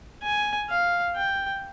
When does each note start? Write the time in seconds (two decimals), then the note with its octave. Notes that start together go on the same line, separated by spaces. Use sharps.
0.23 G#5
0.69 F5
1.16 G5